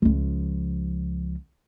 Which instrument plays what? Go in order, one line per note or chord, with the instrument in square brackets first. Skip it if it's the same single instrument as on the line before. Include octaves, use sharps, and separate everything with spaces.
[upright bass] C#2 F3